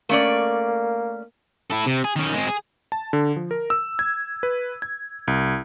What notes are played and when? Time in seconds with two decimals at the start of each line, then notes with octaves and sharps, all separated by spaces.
0.09 A3 A#3 C#4 D5
1.70 E4 A4
1.86 C3
2.04 G#4
2.16 D#3 C#4
2.33 G#3 C4
2.47 G#4
2.92 A5
3.13 D3
3.36 F3
3.51 A#4
3.70 E6
3.99 G#6
4.43 B4
4.82 G#6
5.28 C2